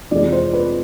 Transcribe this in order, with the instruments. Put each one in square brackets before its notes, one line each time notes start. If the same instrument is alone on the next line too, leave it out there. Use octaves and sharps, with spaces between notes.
[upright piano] F2 C3 E3 G#3 D5
C5
B4